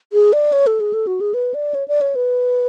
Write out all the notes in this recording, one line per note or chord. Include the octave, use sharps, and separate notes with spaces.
G#4
D5
C#5
A4
G#4
A4
F#4
G#4
B4
D5
C#5
D5
C#5
B4